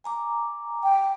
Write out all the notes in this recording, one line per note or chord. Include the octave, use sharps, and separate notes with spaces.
G#5 A#5 D6
G5